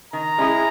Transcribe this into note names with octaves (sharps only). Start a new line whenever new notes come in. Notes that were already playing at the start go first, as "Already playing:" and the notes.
D#3 A#5
G#3 C#4 E4 G#4